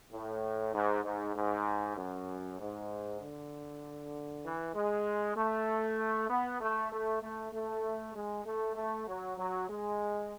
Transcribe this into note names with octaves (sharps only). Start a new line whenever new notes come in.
A2
G#2
G#2
G#2
F#2
G#2
D3
E3
G#3
A3
B3
A3
A3
A3
A3
G#3
A3
A3
F#3
F#3
G#3